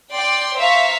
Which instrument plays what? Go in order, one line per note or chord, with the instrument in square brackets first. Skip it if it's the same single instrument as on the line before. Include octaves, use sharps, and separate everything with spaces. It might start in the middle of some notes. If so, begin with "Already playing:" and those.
[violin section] D5 G5 C6
C5 E5 F5 A#5 C#6 B6